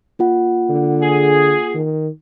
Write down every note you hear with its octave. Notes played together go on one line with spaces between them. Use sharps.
A#3 F4 F#5
D3
G#4
D#3